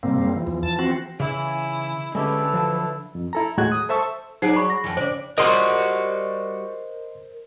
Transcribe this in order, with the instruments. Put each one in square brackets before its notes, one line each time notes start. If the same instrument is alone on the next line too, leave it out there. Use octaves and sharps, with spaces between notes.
[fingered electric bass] G#2 C3 G3 [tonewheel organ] A#3 C4
[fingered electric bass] F#2 G3 G#3
E3 F3
[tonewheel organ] E2
A5
C4 F#4
[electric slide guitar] C#3 E3 [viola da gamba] E4 [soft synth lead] G#5
[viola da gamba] D3 [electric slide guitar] G#3 C#4 G4 [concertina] E4 A4 [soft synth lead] B4
[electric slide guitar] F3 F#3 A5
[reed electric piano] F2
E4 A4 A#5
D#2 A2 G#3 F#4 F#6 G#6
D#6
A4 C5 E5 A5 C#6 E6
[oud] F#3 G#4 D5 [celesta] D#4 C5 C7
[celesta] B5 C#6
A#6
[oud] F2 E3
[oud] C#3 D5 [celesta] C5
[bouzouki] G3 F#4 [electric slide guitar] A#4 C5 [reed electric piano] D#5 C6